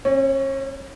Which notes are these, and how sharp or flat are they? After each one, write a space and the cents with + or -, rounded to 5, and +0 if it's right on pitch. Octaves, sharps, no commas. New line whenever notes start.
C#4 -40 C#5 +15